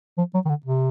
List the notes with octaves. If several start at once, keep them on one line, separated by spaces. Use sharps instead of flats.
F3
F#3
D#3
D3
C3